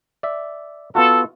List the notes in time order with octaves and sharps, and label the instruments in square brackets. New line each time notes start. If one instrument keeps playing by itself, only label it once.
[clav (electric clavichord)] D5 E5
[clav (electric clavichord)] B3 F4 F#4 [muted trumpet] A4